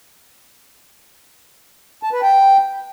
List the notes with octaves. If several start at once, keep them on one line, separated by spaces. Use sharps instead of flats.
A5
B4
G5